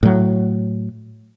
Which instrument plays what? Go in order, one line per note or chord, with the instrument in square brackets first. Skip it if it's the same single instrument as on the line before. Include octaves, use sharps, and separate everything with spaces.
[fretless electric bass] A2 F#3